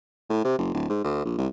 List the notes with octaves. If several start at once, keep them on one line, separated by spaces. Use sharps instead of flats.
A2
C3
F#1
D1
G#2
D2
A#1
C2